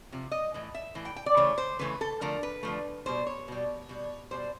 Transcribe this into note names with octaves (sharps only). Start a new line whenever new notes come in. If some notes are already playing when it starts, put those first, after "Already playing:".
C3 F3
D#5
A2 E3
E5
A2 E3
G5
G5
D5
C#3 E3 A3 C#5
C5
C#3 E3 A3 B4
A4
D3 F3 A3 A#4
B4
D3 F3 A3
B2 G3 C5
C#5
B2 G3
B2 G3
B2 G3 C5